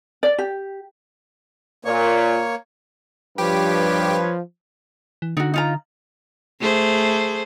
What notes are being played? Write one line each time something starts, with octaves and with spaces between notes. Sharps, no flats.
D5
G4
A#2 A#3 C#5 C#6
G2 F3 G4 B4 C#5
E3
D3 D#4 F#4
D#4 F4 A#5
A3 G#4 C5